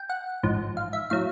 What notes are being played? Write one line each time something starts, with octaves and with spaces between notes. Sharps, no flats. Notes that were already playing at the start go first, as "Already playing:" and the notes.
Already playing: G5
F#5
A1 G#2 F3
F5
E5
A2 F#3 F5